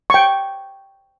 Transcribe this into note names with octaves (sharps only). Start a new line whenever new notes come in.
G5 C#6